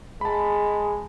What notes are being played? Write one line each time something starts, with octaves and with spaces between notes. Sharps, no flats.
G#3 A5 B5